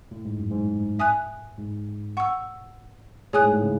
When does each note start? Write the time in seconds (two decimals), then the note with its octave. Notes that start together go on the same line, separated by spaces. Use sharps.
0.11 A2
0.25 G#2
0.38 F#2
0.51 G#2
0.99 E5 G#5 D#6 F#6
1.58 G#2
2.17 F#5 C#6 E6
3.33 A2 G#4 C#5 G#5 D#6 F#6
3.43 G#2
3.53 A2
3.63 C#3